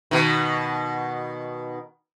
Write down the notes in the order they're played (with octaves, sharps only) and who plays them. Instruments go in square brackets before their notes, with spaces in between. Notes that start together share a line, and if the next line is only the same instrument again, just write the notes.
[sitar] B2 D#3